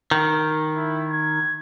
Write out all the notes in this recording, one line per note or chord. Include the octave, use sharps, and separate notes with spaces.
D#3
E4
G#6